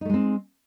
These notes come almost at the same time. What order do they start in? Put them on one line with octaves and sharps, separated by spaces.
D#4 A3 G#3 C4